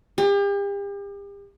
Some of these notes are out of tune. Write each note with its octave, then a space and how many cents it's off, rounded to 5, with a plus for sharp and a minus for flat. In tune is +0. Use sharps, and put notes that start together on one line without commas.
G4 +40